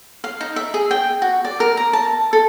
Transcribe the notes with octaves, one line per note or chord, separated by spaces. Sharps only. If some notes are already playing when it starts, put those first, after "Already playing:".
F5
D#4
E5
G#4
G5
F#4
D5
A#4
A#5
A5
A4